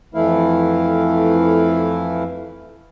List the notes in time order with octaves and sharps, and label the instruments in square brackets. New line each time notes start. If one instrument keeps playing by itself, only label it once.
[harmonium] F2 E3 A3 E4 F5